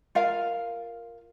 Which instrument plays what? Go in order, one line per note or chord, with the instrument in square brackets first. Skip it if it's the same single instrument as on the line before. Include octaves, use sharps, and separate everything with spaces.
[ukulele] F4 A#4 F5